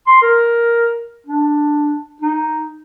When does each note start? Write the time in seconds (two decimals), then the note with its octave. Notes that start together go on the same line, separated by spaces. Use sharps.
0.07 C6
0.22 A#4
1.27 D4
2.22 D#4